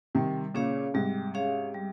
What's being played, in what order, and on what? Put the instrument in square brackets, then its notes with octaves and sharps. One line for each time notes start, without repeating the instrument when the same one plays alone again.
[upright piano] C3 D#3 [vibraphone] G3
[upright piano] A#2 C#3 [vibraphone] C#4 G#4 C#5 F5
[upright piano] G#2 C3 [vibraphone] G3
[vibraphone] C#4 G#4 C#5 F5
G3